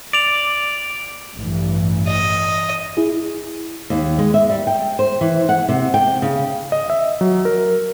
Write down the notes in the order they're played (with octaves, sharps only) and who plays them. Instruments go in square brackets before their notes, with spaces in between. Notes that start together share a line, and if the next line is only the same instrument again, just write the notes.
[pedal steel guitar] D5 [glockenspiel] D7 F7
[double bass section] A1 G2 E3
[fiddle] D#5
[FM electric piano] E4 G#4
[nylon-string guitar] D#2
G#3
E5
G3
G5
C5
E3
F#5
C3
G5
C#3
[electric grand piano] D#5
E5
F#3
A#4